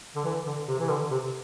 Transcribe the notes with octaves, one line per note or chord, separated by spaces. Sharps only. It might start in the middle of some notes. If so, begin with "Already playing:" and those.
D3
E3
D3
C3
E3
D3
C3